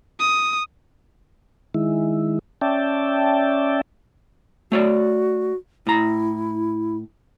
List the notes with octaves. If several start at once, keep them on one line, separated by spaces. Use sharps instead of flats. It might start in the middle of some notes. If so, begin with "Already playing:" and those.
D#6
D#3 G#3 E4
C#4 D5 E5 G5 A5
A3 F#4 C#5 D5
A2 E4 A#5